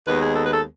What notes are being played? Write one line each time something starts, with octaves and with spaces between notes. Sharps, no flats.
D#2 D#3 G#3 B3 B4
G#4
A4
B4
A4